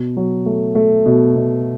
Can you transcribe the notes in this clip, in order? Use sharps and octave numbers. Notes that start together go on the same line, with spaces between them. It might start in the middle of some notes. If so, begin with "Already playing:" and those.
Already playing: B2
F#3
A3
A3
B2
B2